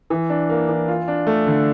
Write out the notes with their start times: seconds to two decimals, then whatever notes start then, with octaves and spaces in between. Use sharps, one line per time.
0.10 E3
0.30 D4
0.49 A#3
0.69 E3
0.88 F4
1.08 D4
1.27 A3
1.47 D3